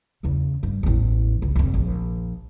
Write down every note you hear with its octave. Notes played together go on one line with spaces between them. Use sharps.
E2 C#3
G2
A1 E2
C#2
F1 D2
A#1